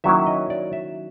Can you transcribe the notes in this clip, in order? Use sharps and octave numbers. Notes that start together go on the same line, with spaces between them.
D#3 F#3 A#3 C#4 E4 E5
D#5
D5
E5